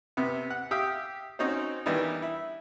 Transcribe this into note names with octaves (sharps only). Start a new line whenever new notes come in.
C3 B3
F#5
G4 E5 F5 G5 D#6
C4 C#4 D#4 F#4 C5
D#3 E3 G3 B3 D4 D#4
E4